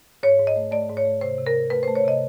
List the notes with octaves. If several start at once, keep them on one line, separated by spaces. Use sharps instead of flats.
G#2 C#5
G#2
D#5
A3
A3 D5
G#2
C#5
A3
C3 C5
C3
A#4
C3
A3 B4
C5
A3
C#5
C3 D#5